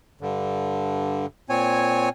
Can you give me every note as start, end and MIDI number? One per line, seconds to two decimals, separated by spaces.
0.21 1.26 43
0.21 1.26 50
1.49 2.09 46
1.49 2.09 60
1.49 2.09 73
1.49 2.09 80